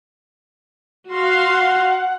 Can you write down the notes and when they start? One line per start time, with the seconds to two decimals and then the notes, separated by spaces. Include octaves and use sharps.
1.10 F#4 F5 C6
1.52 F#5